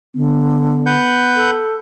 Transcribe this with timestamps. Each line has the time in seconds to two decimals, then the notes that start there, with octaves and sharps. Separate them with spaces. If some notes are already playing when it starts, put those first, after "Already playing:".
0.15 D3 B3
0.86 B4 F#5 G6
1.36 A4